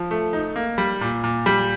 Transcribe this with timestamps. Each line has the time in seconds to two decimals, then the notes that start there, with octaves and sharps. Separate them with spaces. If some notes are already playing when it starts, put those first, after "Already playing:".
Already playing: F3
0.11 A3
0.33 D#4
0.56 A#3
0.78 G3
1.01 A#2
1.24 A#2
1.46 G3